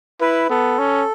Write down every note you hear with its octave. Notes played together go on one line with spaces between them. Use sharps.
E4 B4
B3 A4
C#4